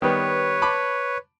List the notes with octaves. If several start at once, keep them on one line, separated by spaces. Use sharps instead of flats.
D#3 G3 B3 B4 C#5
A5 B5 D6